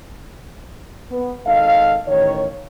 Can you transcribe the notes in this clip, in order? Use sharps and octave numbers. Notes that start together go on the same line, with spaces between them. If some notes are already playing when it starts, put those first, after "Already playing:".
B3
G#1 D#4 A4 D#5 F5
A1 D#3 C#5